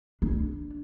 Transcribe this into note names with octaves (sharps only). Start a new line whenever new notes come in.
D4